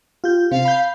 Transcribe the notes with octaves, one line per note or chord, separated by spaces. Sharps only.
F4 G4 G6
C3 C4 F5
B5 G6